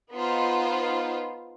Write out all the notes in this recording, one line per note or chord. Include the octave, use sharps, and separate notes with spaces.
B3 D#4 F4 C5